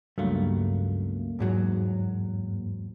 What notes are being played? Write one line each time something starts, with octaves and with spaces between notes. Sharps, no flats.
C#2 G2 F#3 A3 A#3
E2 G#2 F#3